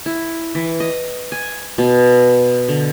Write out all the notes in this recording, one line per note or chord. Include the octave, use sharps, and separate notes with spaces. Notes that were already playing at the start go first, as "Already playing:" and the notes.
E4
E3
D#5
G#5
B2
D3